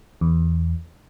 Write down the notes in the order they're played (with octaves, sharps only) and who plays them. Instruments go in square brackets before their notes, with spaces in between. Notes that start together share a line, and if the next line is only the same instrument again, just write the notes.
[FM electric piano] E2